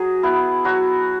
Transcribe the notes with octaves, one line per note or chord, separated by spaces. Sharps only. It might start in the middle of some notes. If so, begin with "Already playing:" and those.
Already playing: F#3 G#4
B3 E4
F#3 F#4